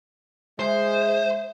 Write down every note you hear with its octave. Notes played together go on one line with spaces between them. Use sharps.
G#3 C5 E5